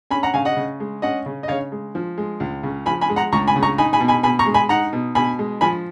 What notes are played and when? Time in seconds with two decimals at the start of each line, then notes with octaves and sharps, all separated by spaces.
0.11 C#4 G#5 B5
0.23 F#5 A#5
0.34 C#3 F5 G#5
0.45 D#5 F#5
0.57 C#3
0.80 G#3
1.02 C#4 D#5 F#5
1.26 C#3
1.43 D#5
1.48 C#3 C#5 F5
1.72 G#3
1.95 F3
2.18 G#3
2.40 C#2
2.63 C#3
2.86 F3 G#5 B5
3.01 G#5 B5
3.09 G#3
3.16 F#5 A#5
3.32 C#2 A#5 C#6
3.48 G#5 B5
3.56 C#3
3.63 A#5 C#6
3.78 D#4 G#5 B5
3.93 G#5 B5
4.00 B2
4.08 G#5 B5
4.23 B2 G#5 B5
4.39 A#5 C#6
4.46 G#3
4.54 G#5 B5
4.69 D#4 F#5 A#5
4.93 B2
5.15 B2 G#5 B5
5.39 G#3
5.61 F3 G#5 B5